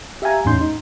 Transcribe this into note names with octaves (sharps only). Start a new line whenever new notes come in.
G4 E5 F5 G5 G#5 A#5
E2 A2 C#4 D#4 C6 G6
D#4